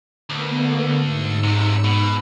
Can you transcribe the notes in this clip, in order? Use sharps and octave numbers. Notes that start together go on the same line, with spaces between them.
D2 D3 A#3 B3
G#2 E6 C#7
B1 C3
B2